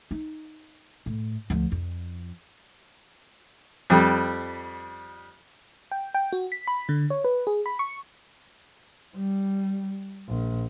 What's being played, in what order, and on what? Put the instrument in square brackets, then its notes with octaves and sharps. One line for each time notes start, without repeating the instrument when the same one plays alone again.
[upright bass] D#4
A2
D2 F3
F2
[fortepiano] F2 G3
[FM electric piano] G5
G5
F#4
B6
B5
D3
C#5
B4
G#4
B5
C#6
[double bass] G3
A#1